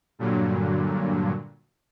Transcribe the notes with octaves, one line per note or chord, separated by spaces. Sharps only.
G2 A#2 D3 F#3